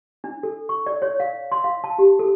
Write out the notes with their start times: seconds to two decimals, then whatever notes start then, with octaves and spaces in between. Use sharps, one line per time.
0.24 D4
0.43 A4
0.69 C#6
0.86 D5
1.02 C#5
1.20 F5
1.52 C6
1.64 F5
1.84 A5
1.98 G4
2.19 A4